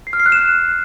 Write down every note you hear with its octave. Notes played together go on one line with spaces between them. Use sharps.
C7
F6
C7
F#6
E7